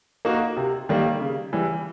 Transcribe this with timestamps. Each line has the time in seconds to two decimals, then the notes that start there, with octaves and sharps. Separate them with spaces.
0.25 A#3 D#4 F#4 A#4
0.57 C3
0.89 D#3 G3 A#3
1.21 C#3
1.53 E3 G3